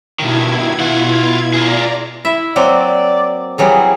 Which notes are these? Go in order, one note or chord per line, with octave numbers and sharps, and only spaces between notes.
G2 B2 D#3 E4 G#6
F4 F#5
F4 G#4 D5 A#5
E4 E5
F#3 A#3 C4 D5
E3 F#3 G3 G#4